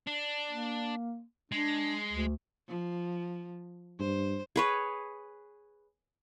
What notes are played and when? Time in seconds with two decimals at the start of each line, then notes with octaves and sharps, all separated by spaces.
0.07 D4
0.50 A#3
1.52 G#3 D4
2.13 D2
2.68 F3
4.00 G2 C5
4.56 G#4 B4 C#5